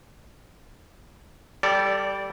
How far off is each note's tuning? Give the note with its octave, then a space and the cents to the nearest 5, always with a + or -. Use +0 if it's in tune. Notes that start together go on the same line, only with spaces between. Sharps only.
G3 +0 A4 +15 D5 -15